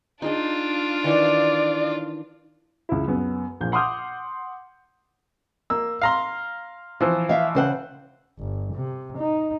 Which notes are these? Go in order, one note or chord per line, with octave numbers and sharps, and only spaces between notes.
D4 D#4 F4 G#4 D#5
D#3 E3 C#5 D5
C#2 E4
F#2 B3
A#1 A#2 G6
F#5 C6 D6 D#6 F6 G6
A#3 E6
F5 A#5 C6
E3 F3 C5
E5 F5
C#3 C5 F#5
G1
C3
D#4